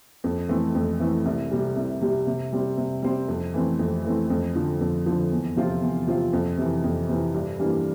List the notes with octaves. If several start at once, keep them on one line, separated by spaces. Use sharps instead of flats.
F2
E3 A3 C4
F2
E3 A3 C4
C2
C3 G3
C2
C3 G3
C3
G3 C4
C3
G3 C4
F2
E3 A3 C4
F2
E3 A3 C4
F2
D3 F3
F2
D3 F3
E2
C3 F3 C4 F4
E2
C3 F3 C4 F4
F2
C3 E3
F2
C3 E3
G2
E3 G3 A#3 D4